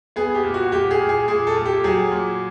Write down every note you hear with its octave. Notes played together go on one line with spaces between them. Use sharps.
B3 G#4
G4
A#2
F#4
A#2 G4
G#4
A#2
G#4
A#2 G#4
A4
A#2
G4
F#3 G#4
A#2